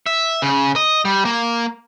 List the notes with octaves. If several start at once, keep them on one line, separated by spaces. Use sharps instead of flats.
E5
C#3
D#5
G3
A#3